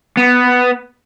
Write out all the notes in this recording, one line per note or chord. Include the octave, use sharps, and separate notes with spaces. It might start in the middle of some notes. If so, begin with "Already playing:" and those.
B3